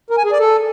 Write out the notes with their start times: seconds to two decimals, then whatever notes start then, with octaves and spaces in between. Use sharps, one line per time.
0.10 A#4
0.17 G#5
0.25 G#4
0.32 D5
0.39 A4